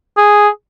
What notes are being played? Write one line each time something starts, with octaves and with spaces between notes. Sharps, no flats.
G#4